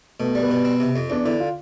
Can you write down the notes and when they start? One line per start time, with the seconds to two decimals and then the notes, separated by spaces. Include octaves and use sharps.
0.20 B2 A3
0.35 G3
0.43 B3
0.51 B2
0.65 C4
0.80 C3
0.96 F2
1.10 E2 D4
1.25 D3 E4
1.40 F4